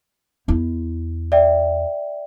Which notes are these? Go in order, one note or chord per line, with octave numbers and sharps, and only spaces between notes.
E2 E4
D5 E5 G5